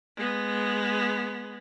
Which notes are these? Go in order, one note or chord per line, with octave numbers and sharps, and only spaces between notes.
G#3 B3